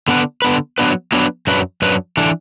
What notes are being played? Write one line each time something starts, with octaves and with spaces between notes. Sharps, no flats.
D3 B3 D4 B4
D3 B3 D4 B4
F#3 B3 D4 B4
F#3 B3 D4 B4
F#2 F#3 D4 B4
F#2 F#3 D4 B4
E3 D4 A4